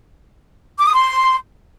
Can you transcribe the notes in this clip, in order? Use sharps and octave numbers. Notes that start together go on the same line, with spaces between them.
D6
D#6
C6